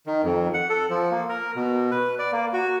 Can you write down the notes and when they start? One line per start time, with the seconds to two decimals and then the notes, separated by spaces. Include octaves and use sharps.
0.07 D#3
0.24 F2
0.54 F#5
0.70 A4
0.90 F3
1.11 A#3
1.29 A#4
1.56 B2
1.91 B4
2.19 D5
2.33 A#3
2.53 F#4